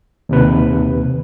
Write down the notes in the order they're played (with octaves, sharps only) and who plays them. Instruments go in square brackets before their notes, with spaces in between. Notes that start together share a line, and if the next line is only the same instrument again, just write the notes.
[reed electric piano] D#2 C3 B4